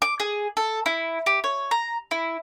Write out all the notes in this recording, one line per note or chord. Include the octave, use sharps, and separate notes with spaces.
D6
G#4
A4
E4
G4
C#5
A#5
E4